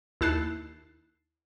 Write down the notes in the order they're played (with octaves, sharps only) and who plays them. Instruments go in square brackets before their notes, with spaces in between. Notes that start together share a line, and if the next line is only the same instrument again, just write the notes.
[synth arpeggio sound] D#2 E4 A5 F#6 C7